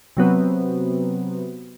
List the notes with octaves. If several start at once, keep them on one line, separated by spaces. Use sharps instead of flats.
C3 F#3 B3 C4